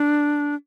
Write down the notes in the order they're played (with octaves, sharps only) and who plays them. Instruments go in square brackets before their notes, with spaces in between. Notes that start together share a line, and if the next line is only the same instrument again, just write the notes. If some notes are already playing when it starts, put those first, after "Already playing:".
Already playing: [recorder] D4